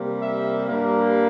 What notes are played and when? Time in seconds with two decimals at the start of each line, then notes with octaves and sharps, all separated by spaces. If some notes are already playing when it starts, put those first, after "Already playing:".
Already playing: C3 G3 A#3
0.22 E5
0.69 G2 G3 A#3